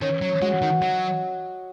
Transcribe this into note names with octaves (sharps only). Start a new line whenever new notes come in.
D#3 C#4
F#3
G#3 F#4
D#3
F#3 D#5